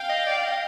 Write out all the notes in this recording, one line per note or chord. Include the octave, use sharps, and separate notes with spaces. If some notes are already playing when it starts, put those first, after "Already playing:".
Already playing: F5 G5
D#5
D5
D#5